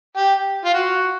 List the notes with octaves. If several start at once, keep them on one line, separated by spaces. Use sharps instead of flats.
G4
F4
F#4